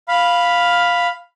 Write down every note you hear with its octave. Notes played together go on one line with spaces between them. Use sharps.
F5 B5